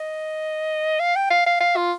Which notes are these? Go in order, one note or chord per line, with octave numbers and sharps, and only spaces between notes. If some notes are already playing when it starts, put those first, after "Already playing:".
Already playing: D#5
F5
G5
F5
F5
F5
F4